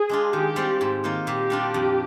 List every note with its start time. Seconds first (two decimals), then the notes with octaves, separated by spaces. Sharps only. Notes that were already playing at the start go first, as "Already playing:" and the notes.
Already playing: G#4
0.09 G#3 D4 F4
0.33 D#3 G4
0.56 G3 C4 F4
0.81 G#2
1.04 D#3 A#3 F4
1.27 A#2 G4
1.50 G3 D4 F4
1.74 F2